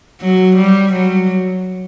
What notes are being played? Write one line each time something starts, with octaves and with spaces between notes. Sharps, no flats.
F#3
G3
F#3